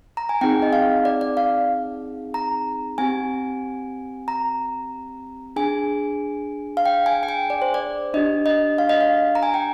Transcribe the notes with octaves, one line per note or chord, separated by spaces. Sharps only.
A#5
G#5
C4 D#4 G#4 G5
D#5
F5
D5
D5
F5
A#5
C4 G4 G#5
A#5
D4 G#4 G#5
F5
G5
G#5
G5
G#5
D5
C5
D5
D4 G4 D#5
D#5
F5
D#5
F5
A#5
G#5
G5